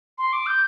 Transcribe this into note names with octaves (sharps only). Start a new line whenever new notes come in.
C6
D6
G6